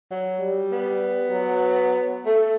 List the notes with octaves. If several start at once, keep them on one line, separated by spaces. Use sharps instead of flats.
F#3
G3
B3
F#3
A3 A4